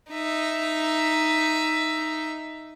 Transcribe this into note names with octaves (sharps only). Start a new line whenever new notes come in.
D#4 E5